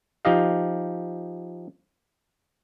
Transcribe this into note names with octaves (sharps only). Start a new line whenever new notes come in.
F3 D#4 G4 D#5 F5